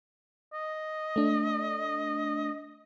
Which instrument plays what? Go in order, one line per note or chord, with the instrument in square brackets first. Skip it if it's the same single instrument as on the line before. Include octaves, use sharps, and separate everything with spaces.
[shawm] D#5
[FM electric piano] A3 D4